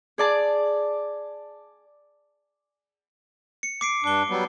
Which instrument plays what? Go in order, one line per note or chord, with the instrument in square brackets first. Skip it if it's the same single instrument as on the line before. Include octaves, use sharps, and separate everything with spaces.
[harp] G#4 D5 A5
[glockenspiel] C#7
D6 C7 D7
[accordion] G2 D4 [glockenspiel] D6 G7
[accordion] F#3 G3 B3